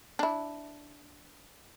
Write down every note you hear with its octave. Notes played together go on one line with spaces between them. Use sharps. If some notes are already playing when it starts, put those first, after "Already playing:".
D4 E4